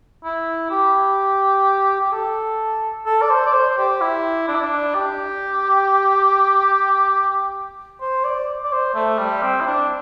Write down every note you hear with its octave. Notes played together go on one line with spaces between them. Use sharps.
E4
G4
G4
A4
A4
D5
C5
D5
C5
G4
E4
D4
E4
D4
G4
C5
D5
D5
C5
A3
G3
C4
E4
D4